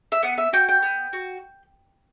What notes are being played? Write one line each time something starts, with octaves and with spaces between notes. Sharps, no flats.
E5
B3 F#5
E5
F#4 G5
G5
B3
F#4